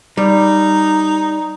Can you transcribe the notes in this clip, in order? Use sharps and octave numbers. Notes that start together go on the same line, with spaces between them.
G3 D#4